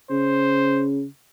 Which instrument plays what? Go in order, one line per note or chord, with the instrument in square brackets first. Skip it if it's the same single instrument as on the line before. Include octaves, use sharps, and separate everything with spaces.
[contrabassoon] C#3 [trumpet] C5